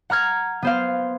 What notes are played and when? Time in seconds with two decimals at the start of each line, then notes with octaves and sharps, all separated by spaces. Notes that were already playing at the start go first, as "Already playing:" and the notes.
0.10 F#5 A#5 F6 G#6
0.62 B3 C5 F5